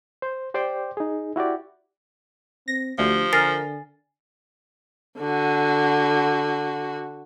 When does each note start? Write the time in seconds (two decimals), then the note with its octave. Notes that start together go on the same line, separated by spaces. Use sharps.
0.22 C5
0.54 G4 C5 D5 G5 C6 D6
0.97 D#4 G#4
1.36 E4 F#4 G4 D5
2.68 C4 A#6
2.99 D2 F3 G4
3.33 D3 A#4 G#5 A6 C7
5.19 D3 F#4